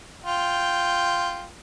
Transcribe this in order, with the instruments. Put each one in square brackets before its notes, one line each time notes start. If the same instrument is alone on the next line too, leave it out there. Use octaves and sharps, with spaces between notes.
[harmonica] F4 G5